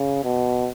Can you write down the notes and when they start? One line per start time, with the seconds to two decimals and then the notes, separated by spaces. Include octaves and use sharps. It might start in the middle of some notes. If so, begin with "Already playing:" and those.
Already playing: C#3
0.24 B2